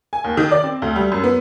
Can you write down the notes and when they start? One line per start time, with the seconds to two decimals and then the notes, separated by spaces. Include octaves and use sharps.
0.13 G#5
0.24 D#2
0.37 D#3
0.51 D5
0.64 C4
0.82 D2
0.96 G3
1.12 F#2
1.24 B3